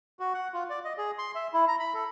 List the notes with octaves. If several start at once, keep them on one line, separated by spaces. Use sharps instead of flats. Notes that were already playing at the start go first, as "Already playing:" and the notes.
F#4
F#5
F4
D5
D#5
G#4
C6
E5
E4
A#5
B5
A4